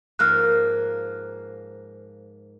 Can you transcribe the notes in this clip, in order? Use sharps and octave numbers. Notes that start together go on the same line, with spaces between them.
G#2 F3 A#3 F6 F#6